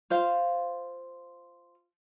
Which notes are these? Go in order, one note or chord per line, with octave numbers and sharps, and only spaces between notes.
F4 C5 F5